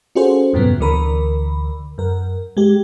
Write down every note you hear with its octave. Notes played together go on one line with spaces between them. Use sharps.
C#4 F4 F#4 G#4 A4 C5
E2 G2 A#2 C#3 F#3 B3
D2 D3 E3 A#4 B5
F#2 A#4
G#3 G4